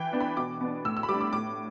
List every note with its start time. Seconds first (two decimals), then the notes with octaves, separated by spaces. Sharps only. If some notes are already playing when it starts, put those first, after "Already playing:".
Already playing: E3 G5
0.13 B3 D4
0.20 B5
0.37 B2 D6
0.61 B3 D4
0.85 A2 E6
0.97 E6
1.03 B5
1.09 G3 D4 D6
1.21 D6
1.33 A2 D6